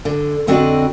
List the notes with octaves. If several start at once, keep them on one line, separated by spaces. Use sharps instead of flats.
D3
F2 D3 C4 F#4 D5 D#5